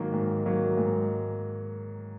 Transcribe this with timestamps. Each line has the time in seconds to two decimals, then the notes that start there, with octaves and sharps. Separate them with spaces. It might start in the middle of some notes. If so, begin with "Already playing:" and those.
Already playing: G#2 D#3 F#3 A#3
0.13 G#2
0.45 D#3 F#3 A#3
0.77 G#2